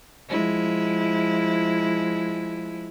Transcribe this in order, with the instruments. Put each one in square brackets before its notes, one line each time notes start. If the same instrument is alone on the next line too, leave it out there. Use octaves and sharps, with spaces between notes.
[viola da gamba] F3 G#3 E4